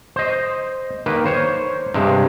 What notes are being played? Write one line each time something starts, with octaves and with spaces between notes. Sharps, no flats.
C5 D#5
D#3 A#3 B4
C5 C#5
G2 C3 G#3